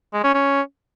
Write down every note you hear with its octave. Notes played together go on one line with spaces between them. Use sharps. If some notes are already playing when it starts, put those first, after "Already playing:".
G#3
C#4
C#4